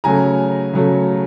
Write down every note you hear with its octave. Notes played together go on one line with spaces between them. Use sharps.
C#3 F#3 A3 G#5 A#5
C#3 F#3 A3